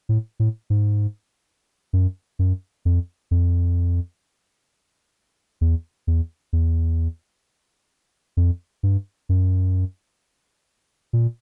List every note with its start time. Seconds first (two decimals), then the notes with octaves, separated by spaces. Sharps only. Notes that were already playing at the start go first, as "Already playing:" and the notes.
0.09 A2
0.40 A2
0.70 G#2
1.93 F#2
2.39 F#2
2.85 F2
3.31 F2
5.61 E2
6.07 E2
6.53 E2
8.37 F2
8.83 G2
9.29 F#2
11.13 A#2